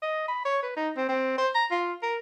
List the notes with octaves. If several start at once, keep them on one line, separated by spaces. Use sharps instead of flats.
D#5
B5
C#5
B4
D#4
C4
C4
C5
A#5
F4
A#4